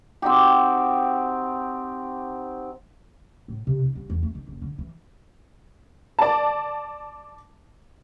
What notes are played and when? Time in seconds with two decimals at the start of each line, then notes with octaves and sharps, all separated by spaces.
0.22 C4 D#4 F#4 G4
3.48 A2
3.67 C3
3.84 D#4
3.95 G1
4.10 E2
4.23 A3
4.35 D#3
4.48 F#1
4.62 D3
4.78 E3
6.19 D5 A5